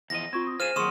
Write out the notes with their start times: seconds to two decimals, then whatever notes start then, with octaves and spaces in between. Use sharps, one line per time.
0.10 E2 F3 D#5 A#6
0.33 C4 F4 C#6 G#6
0.47 D#6
0.60 F4 G#4 C5 F6 D#7 E7
0.76 D#2 F#3 G#4 C6 C#6 D#6 E7